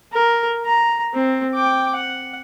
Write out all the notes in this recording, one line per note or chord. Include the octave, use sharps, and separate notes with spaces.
A#4
A#5
C4
G5 D6
F#5